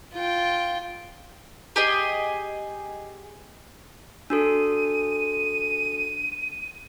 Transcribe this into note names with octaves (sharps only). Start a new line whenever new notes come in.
F4 G5
G4 G#4 D#5
D4 F#4 A4 D#7